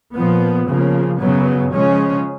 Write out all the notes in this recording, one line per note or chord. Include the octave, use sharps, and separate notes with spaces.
A#2 F3 B3
C#3 F3 A#3
F#2 C#3 F#3 B3
C#3 F3 G#3 C#4